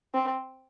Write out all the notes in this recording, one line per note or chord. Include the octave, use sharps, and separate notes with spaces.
C4